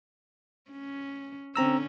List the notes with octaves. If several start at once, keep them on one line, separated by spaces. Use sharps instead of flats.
C#4
D3 C4 C#4 A#5 E6